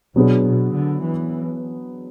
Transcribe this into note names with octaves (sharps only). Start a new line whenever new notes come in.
B2 F#3 B3 D4 G#4 B4
B2
D3
E3